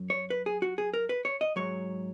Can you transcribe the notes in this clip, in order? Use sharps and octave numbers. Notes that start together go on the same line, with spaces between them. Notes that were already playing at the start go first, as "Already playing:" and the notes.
Already playing: F#2 F#3
C#5
B4
G#4
F#4
G#4
A#4
B4
C#5
D#5
G#2 F#3 C#5